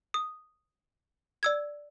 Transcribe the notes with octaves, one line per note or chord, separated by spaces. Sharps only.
D#6
D5 E6 G#6